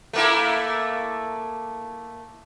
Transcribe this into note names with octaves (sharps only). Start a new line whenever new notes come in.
A3 A#3 E4